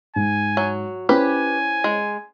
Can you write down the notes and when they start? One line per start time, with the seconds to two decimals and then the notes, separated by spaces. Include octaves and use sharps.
0.16 G#2 G#5
0.57 F#3
1.09 C#4 E4 G4 B4 C5 G#5
1.84 G#3